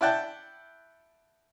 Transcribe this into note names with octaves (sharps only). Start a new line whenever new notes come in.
E4 D5 F#5 G5 A5